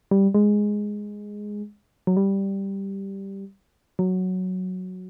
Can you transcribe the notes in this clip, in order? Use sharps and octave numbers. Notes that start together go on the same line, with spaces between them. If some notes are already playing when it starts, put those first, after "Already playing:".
G3
G#3
F#3
G3
F#3